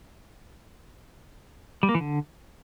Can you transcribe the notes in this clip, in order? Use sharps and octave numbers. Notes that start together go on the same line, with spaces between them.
G3
A#3
E3
D3